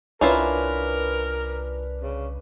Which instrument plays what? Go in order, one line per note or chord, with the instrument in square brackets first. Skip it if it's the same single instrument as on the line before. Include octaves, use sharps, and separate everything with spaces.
[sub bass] C2 [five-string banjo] C#4 E4 F4 [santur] D4 B4 A#5 [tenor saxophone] A#4
[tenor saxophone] C#3